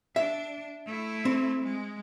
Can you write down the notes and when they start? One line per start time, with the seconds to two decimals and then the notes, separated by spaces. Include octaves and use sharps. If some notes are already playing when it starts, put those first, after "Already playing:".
0.16 D4 E5
0.87 A3 E4
1.25 C4
1.63 G#3